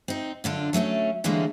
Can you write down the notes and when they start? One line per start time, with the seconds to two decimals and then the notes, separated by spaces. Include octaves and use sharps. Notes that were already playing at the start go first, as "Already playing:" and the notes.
0.08 C4 D#4
0.44 F#2 D3 D4 F4
0.73 F#3 A3 B3 C#4
1.24 D3 E3 G3 G#3 A#3 C#4